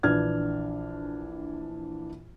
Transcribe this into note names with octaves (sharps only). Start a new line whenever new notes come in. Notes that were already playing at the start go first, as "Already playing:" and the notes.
A#1 E3 D4 F6 G#6